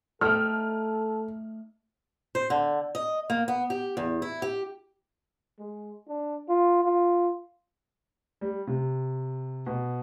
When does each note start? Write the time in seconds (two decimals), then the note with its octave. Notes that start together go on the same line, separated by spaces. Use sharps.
0.21 A3 D#4 A4 G5 F6
2.35 C5
2.50 D3
2.95 D#5
3.30 A#3
3.48 B3
3.70 G4
3.97 E2
4.22 E4
4.42 G4
5.59 G#3
6.08 D4
6.49 F4
6.84 F4
8.41 G3
8.67 C3
9.67 B2